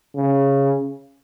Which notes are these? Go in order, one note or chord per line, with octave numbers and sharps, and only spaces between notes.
C#3